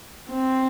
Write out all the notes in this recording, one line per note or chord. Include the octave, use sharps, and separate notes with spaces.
C4